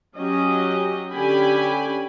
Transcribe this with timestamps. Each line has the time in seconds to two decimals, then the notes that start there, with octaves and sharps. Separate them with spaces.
0.17 F#3 C#4 G4 D#5
1.13 D3 C#4 G4 G#5 B5